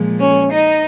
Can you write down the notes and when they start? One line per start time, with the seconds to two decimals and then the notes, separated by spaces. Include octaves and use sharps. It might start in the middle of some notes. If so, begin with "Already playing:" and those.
Already playing: A#2 F3 G#3
0.19 C#4 C#5
0.50 D#4 D#5